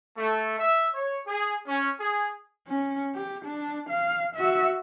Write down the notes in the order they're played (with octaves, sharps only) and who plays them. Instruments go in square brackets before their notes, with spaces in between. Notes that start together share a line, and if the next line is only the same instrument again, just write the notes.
[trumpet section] A3
E5
C#5
G#4
C#4
G#4
[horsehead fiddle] C#4
G4
D4
F5
F#4 E5